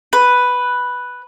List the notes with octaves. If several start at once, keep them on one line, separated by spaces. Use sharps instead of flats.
B4